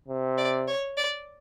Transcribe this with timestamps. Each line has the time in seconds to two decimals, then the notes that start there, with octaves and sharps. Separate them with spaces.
0.08 C3
0.38 D5
0.67 C#5
0.97 D5